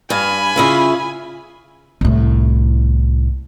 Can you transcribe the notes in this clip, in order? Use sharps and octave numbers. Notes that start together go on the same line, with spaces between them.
G2 F5 G#5 B5
C#3 E4 F4
C2 A2